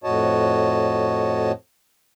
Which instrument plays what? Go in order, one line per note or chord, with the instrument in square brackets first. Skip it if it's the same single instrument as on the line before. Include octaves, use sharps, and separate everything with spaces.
[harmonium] F2 A2 F#4 C#5 D#5 A5